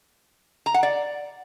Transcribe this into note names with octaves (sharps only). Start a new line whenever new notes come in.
A#5
F#5
D5